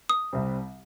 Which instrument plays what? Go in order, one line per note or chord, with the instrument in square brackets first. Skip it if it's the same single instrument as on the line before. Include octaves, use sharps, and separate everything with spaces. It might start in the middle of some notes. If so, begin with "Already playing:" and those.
[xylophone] D#6
[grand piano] C2 C3 G3 C4